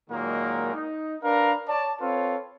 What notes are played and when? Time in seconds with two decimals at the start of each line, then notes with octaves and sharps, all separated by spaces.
0.10 A#2 D#3 F#3 G#3 A#3
0.74 D#4
1.23 D4 A#4 B4 F5 A#5
1.68 C#5 D5 A5
2.00 C4 F4 A4 B4 C#5